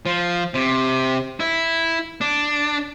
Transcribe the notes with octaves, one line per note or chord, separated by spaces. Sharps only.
F3
C3
E4
D4